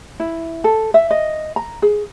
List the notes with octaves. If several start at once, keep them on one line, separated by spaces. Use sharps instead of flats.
E4
A4
E5
D#5
A#5
G#4